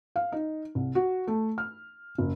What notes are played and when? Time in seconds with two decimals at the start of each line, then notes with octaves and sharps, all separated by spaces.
0.16 F5
0.32 D#4
0.75 C2
0.95 F#4
1.27 A3
1.58 F6
2.18 F#1